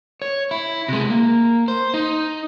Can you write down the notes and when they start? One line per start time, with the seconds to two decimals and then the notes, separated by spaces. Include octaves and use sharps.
0.22 C#5
0.51 E4
0.88 C3 G#3
1.10 A#3
1.68 C5
1.94 D#4